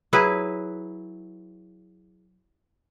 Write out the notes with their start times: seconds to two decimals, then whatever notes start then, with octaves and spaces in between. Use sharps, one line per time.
0.13 F#3 E4 G#4 B4